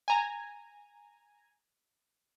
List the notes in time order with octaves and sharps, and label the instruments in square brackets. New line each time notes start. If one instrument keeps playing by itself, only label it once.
[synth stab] G#5 A#5